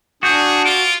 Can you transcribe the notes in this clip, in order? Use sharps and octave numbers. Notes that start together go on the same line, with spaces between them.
D4 F#4 G#4 G6
F4 D7